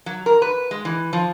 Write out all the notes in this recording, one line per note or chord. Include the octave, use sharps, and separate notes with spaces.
F#3
A#4
B4
G#3
E3
F3